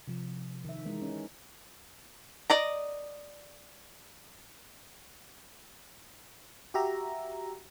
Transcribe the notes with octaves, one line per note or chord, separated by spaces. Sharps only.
C3 F3
D#3 E5
E3 G#3 D#4
C#4
D5 D#5 A#5
F#4 G4 E5 A#5